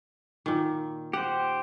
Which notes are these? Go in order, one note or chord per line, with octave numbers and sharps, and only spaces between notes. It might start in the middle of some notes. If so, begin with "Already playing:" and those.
A#2 D#3
G4 C5 F#5